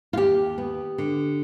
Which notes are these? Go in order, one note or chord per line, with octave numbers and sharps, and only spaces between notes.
F4
D#2 G4
B3
D3